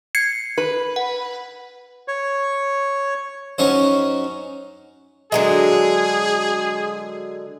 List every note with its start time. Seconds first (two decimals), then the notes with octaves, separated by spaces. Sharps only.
0.15 G#6 C7 C#7
0.58 B4
0.96 F#5
2.08 C#5
3.58 F#2 C#4 D#4 C5
5.32 D3 F#3 G#3 G#4